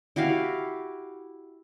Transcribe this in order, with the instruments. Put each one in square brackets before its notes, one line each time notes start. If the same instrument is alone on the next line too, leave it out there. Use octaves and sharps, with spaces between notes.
[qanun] E4 F#4 G4 F5